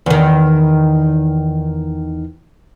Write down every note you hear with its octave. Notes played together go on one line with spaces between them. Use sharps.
E2 D#3